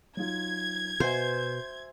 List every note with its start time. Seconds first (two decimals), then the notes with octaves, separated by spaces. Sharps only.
0.17 F#3 D#4 F4 G#6
1.00 B2 F#4 C5 E5 G#5